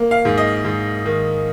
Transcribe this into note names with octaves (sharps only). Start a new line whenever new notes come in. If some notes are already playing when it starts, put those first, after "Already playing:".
Already playing: A#3
F5
G#2
D#5
G#2
D#3